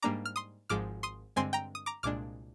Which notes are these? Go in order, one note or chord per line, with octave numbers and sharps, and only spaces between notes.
G#2 G3 A#3 D4 A#5 D6
F6
C6 D#6
G#1 G#2 F3 G#3 D6 F6
C6 D#6
G2 D3 G#3 C4 G#5 C6
G5 A#5
D#6
A#5 D6
C2 A#2 G#3 D4 D6 F6